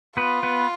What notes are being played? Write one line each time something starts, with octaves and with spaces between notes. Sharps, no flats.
B3 F4 B4
B3 B4